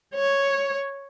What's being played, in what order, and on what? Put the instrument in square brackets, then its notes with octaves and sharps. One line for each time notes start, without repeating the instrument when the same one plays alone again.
[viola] C#5